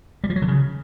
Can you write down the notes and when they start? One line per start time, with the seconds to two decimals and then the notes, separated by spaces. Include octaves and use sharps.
0.24 G3
0.30 F3
0.36 F#3
0.42 D3
0.48 C#3